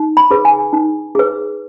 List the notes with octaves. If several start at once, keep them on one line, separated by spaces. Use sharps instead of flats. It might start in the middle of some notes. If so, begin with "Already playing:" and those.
Already playing: D#4
B5
G#4 B4
G#5
D#4
G#4 B4